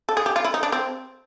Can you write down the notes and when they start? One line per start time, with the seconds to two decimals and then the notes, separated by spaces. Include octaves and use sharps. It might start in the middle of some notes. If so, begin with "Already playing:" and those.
0.09 A4
0.17 G#4
0.26 G4
0.36 F4
0.45 E4
0.54 D#4
0.63 D4
0.72 C4